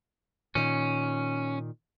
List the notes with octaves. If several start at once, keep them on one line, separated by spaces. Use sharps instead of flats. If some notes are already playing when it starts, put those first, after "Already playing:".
A#2 D#3 C#4